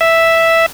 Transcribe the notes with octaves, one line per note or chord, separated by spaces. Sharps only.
E5